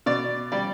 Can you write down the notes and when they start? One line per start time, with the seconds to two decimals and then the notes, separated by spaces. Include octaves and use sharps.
0.06 B2 D5
0.52 G3 D5